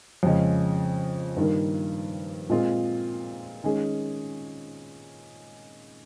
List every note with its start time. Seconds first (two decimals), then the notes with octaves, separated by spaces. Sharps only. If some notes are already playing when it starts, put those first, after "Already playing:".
0.23 F2 C#3 G#3 C#4
1.37 G2 D#3 A#3
2.50 A#2 G#3 C4 F4 G#4
3.64 D#3 G#3 C#4 G#4